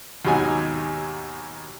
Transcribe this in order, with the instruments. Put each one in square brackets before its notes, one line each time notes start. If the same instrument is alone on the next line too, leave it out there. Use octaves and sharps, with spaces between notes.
[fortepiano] D#2 G#2 B2 F#3 D#4 G#5